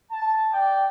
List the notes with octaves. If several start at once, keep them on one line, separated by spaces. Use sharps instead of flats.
A5
D5 G5